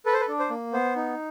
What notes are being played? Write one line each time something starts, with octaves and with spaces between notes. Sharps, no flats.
A4 B4
C5
B4
D4
C5
A#3
B3 C5
D#4